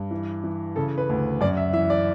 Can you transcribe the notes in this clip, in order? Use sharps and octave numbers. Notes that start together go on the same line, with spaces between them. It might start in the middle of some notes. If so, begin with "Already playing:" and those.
Already playing: G2
E3
E3
C#3 A4
B4
D2
F#2 D5
E5
E3 E5
D5